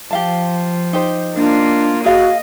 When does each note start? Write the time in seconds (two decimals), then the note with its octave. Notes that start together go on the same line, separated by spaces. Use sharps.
0.11 F3 G4 F5 A5
0.93 D#4 G4 C5
1.36 A#3 D4 F4
2.04 F#4 G#4 D#5 F5